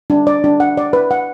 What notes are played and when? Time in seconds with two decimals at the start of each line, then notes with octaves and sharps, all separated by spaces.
0.10 D4
0.27 D5
0.44 D4
0.60 F#5
0.77 D5
0.93 B4
1.11 F#5